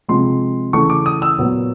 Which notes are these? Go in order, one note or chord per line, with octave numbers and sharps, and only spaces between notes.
C3 F3 G#3 C6
C#3 E3 A3 C#6
D6
D#6
E6
A#2 F#3 B3